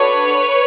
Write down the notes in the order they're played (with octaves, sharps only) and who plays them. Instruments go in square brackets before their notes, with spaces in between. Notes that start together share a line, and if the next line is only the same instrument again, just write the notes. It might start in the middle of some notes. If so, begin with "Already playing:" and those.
Already playing: [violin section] D4 F#4 A4 B4 C#5